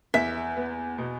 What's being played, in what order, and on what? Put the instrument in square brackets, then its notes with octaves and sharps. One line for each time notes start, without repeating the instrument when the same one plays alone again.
[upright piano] E2 [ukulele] E5
[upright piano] B3
B2